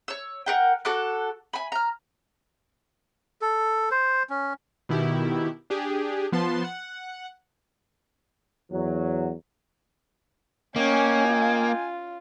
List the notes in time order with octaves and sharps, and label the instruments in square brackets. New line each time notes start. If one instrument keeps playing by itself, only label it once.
[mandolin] C#5 E6
A#4 F#5 G5
F#4 A4 D6 F#6
G#5 B5
A#5 F6
[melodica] A4
C5
C#4
[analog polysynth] B2 D#3 E4 G4
D4 G4 G#4
F3 B3 A5 C6
F#5
[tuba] E2 [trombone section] F#3
[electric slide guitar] A#3 [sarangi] C#4 [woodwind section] D#5 G5 G#5
[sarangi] F4